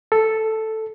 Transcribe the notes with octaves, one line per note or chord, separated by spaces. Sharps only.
A4